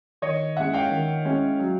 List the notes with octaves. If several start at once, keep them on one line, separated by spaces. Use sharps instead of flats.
D#3 C#5 D#5
G#3 C#4 E4 E5 F#5
F5 G5
D#3
G#3 C#4 E4
F#3